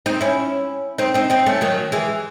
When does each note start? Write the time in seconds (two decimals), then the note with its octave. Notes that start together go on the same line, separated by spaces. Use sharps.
0.06 C4 D#4
0.21 C#4 E4
0.98 C4 D#4
1.14 C4 D#4
1.30 C4 D#4
1.46 A3 C#4
1.61 D#3 F#3
1.92 E3 G#3